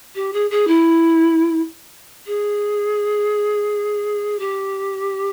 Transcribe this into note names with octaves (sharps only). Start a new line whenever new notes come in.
G4
G#4
G#4
E4
G#4
G4